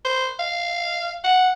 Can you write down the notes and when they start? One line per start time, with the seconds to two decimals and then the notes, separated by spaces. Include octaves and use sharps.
0.05 C5
0.39 F5
1.24 F#5